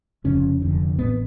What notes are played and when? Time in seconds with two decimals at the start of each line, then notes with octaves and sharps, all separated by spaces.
0.24 F1 F2 C#3 C#4
0.62 F1 F2 D3
0.99 A1 A2 B3